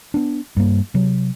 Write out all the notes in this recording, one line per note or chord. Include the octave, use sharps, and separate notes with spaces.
B3 D4
G2 A#3
C3 F#3